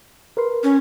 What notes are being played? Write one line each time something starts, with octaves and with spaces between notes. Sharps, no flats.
A#4 B4 C6
C#4